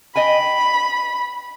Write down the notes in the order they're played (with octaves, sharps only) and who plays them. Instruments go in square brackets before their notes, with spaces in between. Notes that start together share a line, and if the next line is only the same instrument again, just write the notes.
[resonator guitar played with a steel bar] D#5 G5 G#5 [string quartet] B5